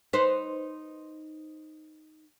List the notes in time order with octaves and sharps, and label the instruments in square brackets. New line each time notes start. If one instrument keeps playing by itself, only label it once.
[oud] D#4 B4 C5